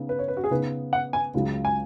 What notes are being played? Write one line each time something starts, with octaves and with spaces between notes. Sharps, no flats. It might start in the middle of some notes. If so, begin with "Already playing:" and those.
Already playing: C#3 B3 D#4
B4
C#5
B4
F#4
G#4
C#3 B3 D#4 B4
F#5
G#5
C#2 C#3 F#3
G#5